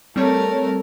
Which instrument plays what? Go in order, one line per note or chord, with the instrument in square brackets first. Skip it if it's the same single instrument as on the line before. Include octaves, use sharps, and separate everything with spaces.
[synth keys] G3 C4 C#5 [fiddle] A3 A#4